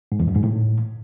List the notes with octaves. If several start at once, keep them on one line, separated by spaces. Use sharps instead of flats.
G#2
E2
F#2
G#2
A2